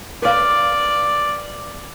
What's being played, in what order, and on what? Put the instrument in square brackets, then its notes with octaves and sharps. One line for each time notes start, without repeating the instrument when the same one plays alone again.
[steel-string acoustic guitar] B4 F5 [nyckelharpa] D5